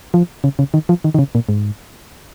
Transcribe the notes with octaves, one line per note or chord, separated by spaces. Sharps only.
F3
C#3
C#3
D#3
F3
D#3
D#3
C#3
A#2
G#2